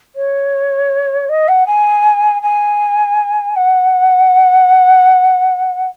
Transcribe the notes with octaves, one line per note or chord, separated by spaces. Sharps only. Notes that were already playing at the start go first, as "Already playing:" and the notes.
C#5
D#5
F#5
G#5
G#5
F#5